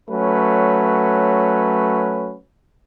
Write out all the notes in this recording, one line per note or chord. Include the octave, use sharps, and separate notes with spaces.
F#3 A3 C#4 B4